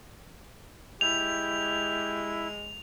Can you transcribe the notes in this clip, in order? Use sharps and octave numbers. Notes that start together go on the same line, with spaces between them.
G#3 E4 G4 F7